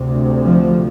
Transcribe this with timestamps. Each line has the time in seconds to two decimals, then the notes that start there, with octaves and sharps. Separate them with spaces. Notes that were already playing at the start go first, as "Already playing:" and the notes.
Already playing: D2 C3
0.44 F3